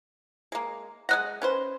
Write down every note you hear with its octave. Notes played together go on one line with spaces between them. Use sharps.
G#3 A#3
G#3 D#5 F#5 F#6 A#6
C#4 B4 C5